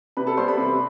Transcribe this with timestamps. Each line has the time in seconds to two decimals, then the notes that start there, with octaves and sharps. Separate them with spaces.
0.17 C3 B4 B5
0.27 A4 A5
0.38 G3 B3 C5 C6
0.48 B4 B5
0.57 C3